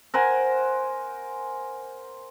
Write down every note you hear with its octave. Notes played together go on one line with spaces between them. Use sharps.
A#4 C5 F#5 G#5